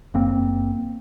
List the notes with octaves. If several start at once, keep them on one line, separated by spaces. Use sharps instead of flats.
F#1 A#3 C4